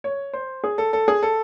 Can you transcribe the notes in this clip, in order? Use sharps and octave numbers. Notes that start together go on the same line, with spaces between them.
C#5
C5
G#4
A4
A4
G#4
A4